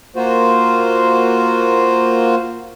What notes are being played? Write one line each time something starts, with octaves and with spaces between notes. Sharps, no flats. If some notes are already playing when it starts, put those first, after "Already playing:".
A#3 F4 F#4 C5